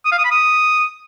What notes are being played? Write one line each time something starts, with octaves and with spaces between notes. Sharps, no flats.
D#6
F5
D#6
B5
D#6